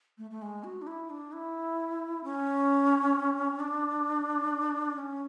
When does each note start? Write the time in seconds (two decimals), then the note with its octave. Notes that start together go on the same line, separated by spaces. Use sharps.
0.18 A3
0.31 A3
0.42 G#3
0.64 F#4
0.82 D4
0.87 E4
1.10 D4
1.32 E4
2.24 C#4
3.60 D4
4.96 C#4